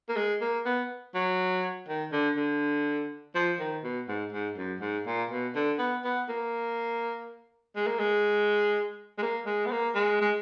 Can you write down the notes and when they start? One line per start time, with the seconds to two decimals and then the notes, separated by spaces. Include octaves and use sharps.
0.09 A#3
0.17 G#3
0.41 A#3
0.66 B3
1.15 F#3
1.88 D#3
2.12 D3
2.37 D3
3.35 F3
3.60 D#3
3.84 B2
4.08 G#2
4.32 G#2
4.58 F#2
4.81 G#2
5.07 A#2
5.31 B2
5.55 D3
5.79 B3
6.05 B3
6.29 A#3
7.76 G#3
7.87 A#3
8.00 G#3
9.18 G#3
9.22 A#3
9.46 G#3
9.66 B3
9.72 A#3
9.95 G#3
10.21 G#3